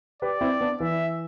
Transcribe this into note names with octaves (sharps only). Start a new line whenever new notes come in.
G4 B4 D5
C4 E4
B3 D4
E3 E5